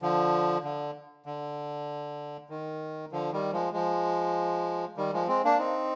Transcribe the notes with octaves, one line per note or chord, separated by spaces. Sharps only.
D3 F3
D3
D3
D#3
D3 F3
D#3 G3
F3 G#3
F3 G#3
D#3 G3
F3 G#3
G#3 C4
A#3 D4
C4 D#4